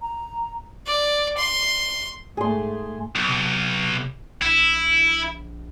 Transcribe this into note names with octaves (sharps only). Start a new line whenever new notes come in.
A#5
D5
C6
G#2 A3 G#4 C6
B1
C3
A#1 E4